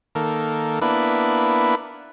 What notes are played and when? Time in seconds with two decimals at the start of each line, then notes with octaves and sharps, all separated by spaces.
0.15 D#3 A#3 A4
0.82 A#3 B3 D4 E4 B4